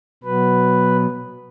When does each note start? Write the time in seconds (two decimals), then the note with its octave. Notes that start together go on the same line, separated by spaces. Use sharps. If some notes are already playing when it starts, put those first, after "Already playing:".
0.23 B2 F#3 B3 B4